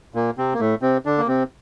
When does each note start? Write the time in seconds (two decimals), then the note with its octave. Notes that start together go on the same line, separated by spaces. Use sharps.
0.14 A#2 A#3
0.38 C3 C4
0.54 A#3
0.60 A2 A3
0.82 C3 C4
1.06 D3 D4
1.18 A#3
1.28 C3 C4